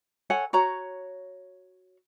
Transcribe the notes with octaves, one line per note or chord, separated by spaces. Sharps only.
A4 C#5 F#5 G#5
F#4 C#5 A#5